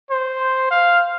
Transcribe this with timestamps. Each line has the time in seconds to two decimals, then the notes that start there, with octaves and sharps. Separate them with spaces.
0.11 C5
0.71 F5